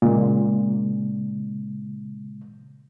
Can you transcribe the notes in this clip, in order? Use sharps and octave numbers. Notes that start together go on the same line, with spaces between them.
A#2 C#3 G#3